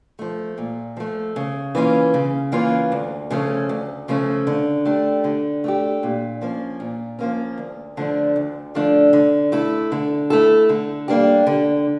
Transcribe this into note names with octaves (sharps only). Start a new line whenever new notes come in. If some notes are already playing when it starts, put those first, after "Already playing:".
F3 A3
A#2
F3 A3
C#3
E3 A#3 C#4 F4
C#3
E3 A#3 C#4 F4
D2
C#3 F3 A3 C#4
D2
C#3 F3 A3 C#4
D3
A3 D4 G4
D3
A3 D4 G4
A#2
F3 A#3 C#4
A#2
F3 A#3 C#4
D2
D3 F3 A3 D4
D2
D3 F3 A3 D4
D3
A3 E4 A4
D3
A3 E4 A4
D3
G3 A#3 D4 G4
D3